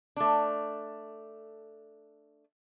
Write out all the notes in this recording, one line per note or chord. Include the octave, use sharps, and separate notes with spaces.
A3 D4